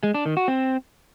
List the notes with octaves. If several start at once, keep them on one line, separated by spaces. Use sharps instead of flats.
G#3
D4
D#3
F#4
C4